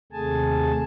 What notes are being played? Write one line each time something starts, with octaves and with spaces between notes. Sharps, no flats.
D#2 C3 A3 G#4 G#5 A5